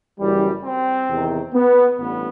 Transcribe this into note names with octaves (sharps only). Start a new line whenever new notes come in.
F#1 F#2 E3 G3
C4
E2 C3 D#3
B3
A1 G2 B3